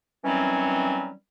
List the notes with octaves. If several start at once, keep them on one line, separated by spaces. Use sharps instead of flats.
D#3 E3 F#3 G3 C4 C#4